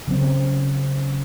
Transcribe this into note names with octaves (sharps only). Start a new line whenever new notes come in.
C#3 F#3 C4